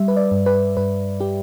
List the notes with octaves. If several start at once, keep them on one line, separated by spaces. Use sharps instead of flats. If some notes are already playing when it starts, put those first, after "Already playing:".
Already playing: G3 E5
B4
D5
G2
B4
G2 B4
G4